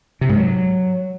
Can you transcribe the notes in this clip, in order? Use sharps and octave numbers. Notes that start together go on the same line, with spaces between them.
C3
G#2
F#3